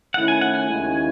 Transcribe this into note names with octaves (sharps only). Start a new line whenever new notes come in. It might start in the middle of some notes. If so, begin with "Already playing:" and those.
D#3 A3 C#4 E4 F#5
G#5
F#5
G#5
D#2 C#3 G#3 C#4 E4